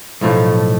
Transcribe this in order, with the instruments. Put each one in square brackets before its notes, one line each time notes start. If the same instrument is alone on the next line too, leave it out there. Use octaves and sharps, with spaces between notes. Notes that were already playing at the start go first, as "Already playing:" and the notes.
[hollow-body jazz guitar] B1 A2 F3 A3